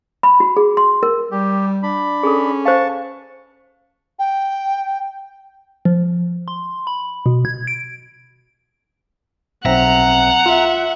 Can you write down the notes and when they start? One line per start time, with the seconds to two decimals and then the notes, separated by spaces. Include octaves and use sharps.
0.23 B5
0.40 F#4
0.57 G#4
0.77 C6
1.03 A#4
1.31 G3 G4
1.83 D4 B5
2.23 C#4 G#4 A4
2.65 C5 F5 A5 C#6
4.19 G5
5.85 F3
6.48 C6
6.87 B5
7.26 B2
7.45 G#6
7.67 D7
9.65 B1 C4 E5 F#5 A#5
10.46 F4 E5